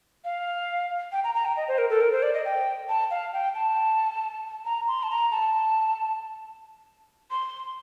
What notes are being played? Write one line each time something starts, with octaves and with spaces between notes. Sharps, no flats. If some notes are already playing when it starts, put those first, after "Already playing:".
F5
G5
A#5
A#5
G5
D#5
C5
A#4
A4
A#4
C5
D5
D#5
G5
A5
F5
G5
A5
A#5
C6
A5
A#5
A5
C6